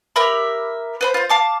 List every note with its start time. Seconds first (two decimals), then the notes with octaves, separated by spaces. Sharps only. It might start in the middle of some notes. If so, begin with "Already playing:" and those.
0.16 G4 A#4 E5 B5
1.01 B4 C5 B5
1.14 F4 C5
1.30 F5 A5 D6